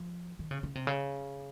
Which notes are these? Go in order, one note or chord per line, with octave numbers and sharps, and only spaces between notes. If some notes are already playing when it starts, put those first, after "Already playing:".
Already playing: F3
D#3
C#3
C#3
C3
C#3